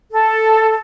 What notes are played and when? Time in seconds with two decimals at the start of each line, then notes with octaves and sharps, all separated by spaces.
0.11 A4